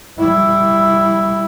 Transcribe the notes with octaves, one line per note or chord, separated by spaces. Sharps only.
G3 E4